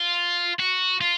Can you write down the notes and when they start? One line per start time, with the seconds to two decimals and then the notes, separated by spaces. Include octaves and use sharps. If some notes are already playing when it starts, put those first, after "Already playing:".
Already playing: F4
0.59 F#4
1.01 F4